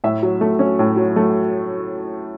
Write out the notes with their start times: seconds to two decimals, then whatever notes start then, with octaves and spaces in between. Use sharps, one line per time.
0.04 A2 E5
0.23 F#3
0.41 A3
0.59 C#4
0.79 A2
0.97 F#3
1.16 A3